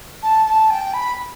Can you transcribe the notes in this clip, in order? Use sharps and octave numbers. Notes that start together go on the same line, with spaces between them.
A5
A5
G5
B5